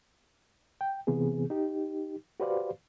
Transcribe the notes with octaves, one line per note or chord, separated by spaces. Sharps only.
G5
C3 E3 B3 C4 G#4
D#4 G4
F#4 G4 B4 C5 D5 F5